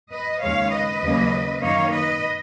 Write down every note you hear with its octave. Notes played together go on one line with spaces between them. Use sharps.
B4 D#5
D#2 C#3 G#3 C#5 F5
B4 D#5
D#2 C#3 F#3 A#3 C#4
F#2 D#3 A#3 D#4 C#5 F5
B4 D#5